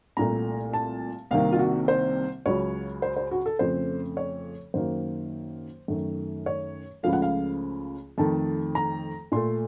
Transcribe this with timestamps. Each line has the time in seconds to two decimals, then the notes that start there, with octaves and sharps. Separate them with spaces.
0.17 C2 A#2 A3 A#5
0.73 A5
1.31 C2 C3 D#3 A#3 F5
1.52 F4
1.59 F#4
1.88 C5
2.46 C#2 C#3 F#3 C#5
3.02 C5
3.16 C5
3.31 F#4
3.46 A4
3.59 F2 C#3 F3 A3 C5
4.17 C#5
4.74 F#2 D#3 F#3 A#3 C5
5.88 F#2 D#3 A3
6.46 C#5
7.03 C#2 C#3 F3 A3 F5
7.13 F#5
7.22 F5
8.18 F2 D#3 A3 A5
8.75 A#5
9.32 A#2 A3 C6